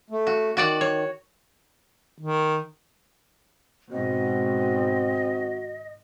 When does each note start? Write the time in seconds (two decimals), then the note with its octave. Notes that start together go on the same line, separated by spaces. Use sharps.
0.10 A3
0.27 F#4
0.57 D#3 F#4 D5 F#5
0.81 C#5
2.20 D#3
3.92 G#1 G#2 B2 C4 F#4 D#5